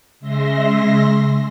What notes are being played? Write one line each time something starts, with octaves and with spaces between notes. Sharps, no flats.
C#3 G#3 E5 C6 A#6